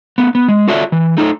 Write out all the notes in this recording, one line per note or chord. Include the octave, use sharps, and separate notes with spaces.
A3 B3
B3
G#3
F4 F#4 A4 C#5 D5 E5
E3
A3 D#4 A4